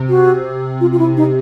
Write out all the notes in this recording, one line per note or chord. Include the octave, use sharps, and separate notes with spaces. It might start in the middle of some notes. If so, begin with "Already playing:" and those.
Already playing: C3
F#4
F4
F4
E4
D#4